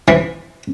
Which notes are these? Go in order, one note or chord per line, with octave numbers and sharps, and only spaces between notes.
E3